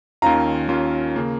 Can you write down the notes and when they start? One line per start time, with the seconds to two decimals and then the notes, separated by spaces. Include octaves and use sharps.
0.22 D#2 D#3 C#4 F4 F5 A#5
0.68 D#2 D#3 C#4 F4
1.16 C#3 A#3